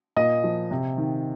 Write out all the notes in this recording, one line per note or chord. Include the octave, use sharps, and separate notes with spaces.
A#2 D#5 D#6
F3
C3
D#3